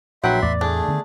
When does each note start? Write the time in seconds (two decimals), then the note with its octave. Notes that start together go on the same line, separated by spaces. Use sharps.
0.24 A#1 F#3 B4 E5 F#5 G5 C6
0.42 E2 A2 D5
0.61 A3 D4 G#4
0.88 D3 D#3 B3